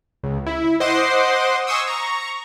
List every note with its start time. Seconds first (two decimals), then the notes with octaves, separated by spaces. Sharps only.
0.23 C#2
0.46 E4
0.80 C5 D#5 F#5 C6 D6
1.67 G#5 C6 C#6 D#6 E6
1.87 A#5 C#6